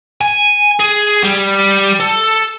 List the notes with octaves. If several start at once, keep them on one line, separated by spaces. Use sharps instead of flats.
G#5
G#4
G3
A4